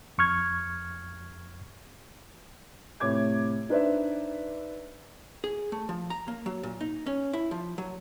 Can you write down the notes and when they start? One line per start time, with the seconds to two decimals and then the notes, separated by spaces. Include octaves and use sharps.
0.18 F2 C#6 F6 G#6
3.00 A2 C3 C#5 D6 G#6
3.69 D4 D#4 B4 C5 D5 E5
5.44 G#4
5.72 A3
5.89 F3
6.10 A#5
6.28 A#3
6.46 F#3
6.63 A#2
6.81 D#4
7.06 C#4
7.33 E4
7.51 F3
7.78 F#3